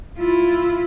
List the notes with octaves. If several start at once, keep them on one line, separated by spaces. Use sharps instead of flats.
E4 F4